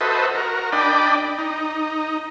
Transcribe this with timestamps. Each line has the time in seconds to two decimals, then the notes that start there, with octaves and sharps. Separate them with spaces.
0.01 F#4 A4 B4 C5 D#5 E5
0.35 F#4 A#4
0.72 D4 D5 D#5 G5 B5
1.39 D#4